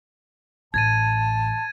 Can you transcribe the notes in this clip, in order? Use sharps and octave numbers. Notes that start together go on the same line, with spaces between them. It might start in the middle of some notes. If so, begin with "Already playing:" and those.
A1 A5 G#6 A6 D#7